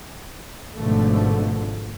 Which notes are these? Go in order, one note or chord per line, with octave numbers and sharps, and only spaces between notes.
G#1 G#2 B2 D3 F3 A3